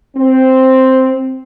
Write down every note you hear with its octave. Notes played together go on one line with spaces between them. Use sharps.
C4